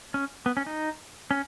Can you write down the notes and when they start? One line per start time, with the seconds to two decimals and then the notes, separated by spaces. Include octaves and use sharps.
0.14 C#4
0.46 B3
0.57 C#4
0.66 D#4
1.31 C#4